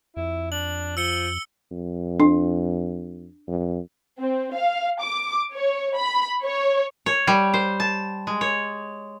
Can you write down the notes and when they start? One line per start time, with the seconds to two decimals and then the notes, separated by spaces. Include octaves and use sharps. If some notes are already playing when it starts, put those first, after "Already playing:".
0.17 F2 E4
0.52 D4 F#7
0.97 F3 E6 C#7 G7
1.71 F2
2.20 D4
3.48 F2
4.20 C4
4.55 F5
5.01 D6
5.53 C#5
5.96 B5
6.43 C#5
7.06 C#5
7.27 G3
7.54 C5
7.80 A5
8.27 G#3
8.41 C#5